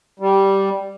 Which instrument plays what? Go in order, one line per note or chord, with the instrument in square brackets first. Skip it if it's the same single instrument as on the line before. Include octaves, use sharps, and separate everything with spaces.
[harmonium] G3